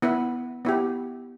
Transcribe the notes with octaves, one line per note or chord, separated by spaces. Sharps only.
B3 E4 B4
B3 E4 G4